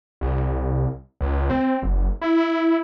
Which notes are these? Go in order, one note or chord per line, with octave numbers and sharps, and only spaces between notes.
C2
C#2
C4
F#1
E4